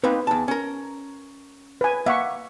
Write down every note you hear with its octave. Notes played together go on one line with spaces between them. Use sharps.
A#3 C4 D#4 B4
E2 A5
C#4 A#4
B4 G#5
A#3 E5 F#5 C#6